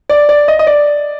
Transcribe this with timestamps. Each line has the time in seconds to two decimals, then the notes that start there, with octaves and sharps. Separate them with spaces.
0.09 D5
0.29 D5
0.48 D#5
0.59 D#5
0.67 D5